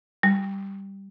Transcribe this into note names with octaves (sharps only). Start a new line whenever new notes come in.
G3